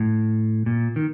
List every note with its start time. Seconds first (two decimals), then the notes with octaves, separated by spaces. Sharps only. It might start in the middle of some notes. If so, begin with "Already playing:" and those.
Already playing: A2
0.66 A#2
0.96 D#3